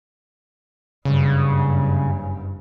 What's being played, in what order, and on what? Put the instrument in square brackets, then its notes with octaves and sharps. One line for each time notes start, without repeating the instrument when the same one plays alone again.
[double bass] F#1 G2 [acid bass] C#3